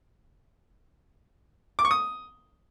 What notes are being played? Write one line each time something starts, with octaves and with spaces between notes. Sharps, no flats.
D6
C#6
D#6